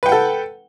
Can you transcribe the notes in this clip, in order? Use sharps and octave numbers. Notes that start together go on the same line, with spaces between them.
A4 B4 F#5 G5